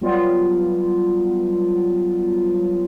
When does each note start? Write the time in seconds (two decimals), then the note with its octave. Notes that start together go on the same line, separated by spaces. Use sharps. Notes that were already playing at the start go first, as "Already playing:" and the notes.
0.01 F#3 G3 B3 F4